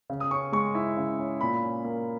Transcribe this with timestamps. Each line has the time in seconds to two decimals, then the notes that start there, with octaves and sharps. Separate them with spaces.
0.10 C#3
0.20 D#6
0.31 C#4 C#6
0.52 G#3 C#6
0.75 E4
0.97 C#3
1.19 C#4
1.41 A#2 B5
1.62 C#4
1.84 A#3